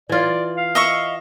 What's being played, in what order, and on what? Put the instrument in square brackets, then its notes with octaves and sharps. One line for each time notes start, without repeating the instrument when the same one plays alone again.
[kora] E3 F4 [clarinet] D5
[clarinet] F5
[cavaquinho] D#5 E5 C#6